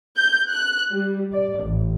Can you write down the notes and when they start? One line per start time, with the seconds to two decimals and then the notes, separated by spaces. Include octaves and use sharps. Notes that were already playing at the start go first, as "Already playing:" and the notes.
0.16 G6
0.49 F#6
0.90 G3
1.32 D5
1.64 A1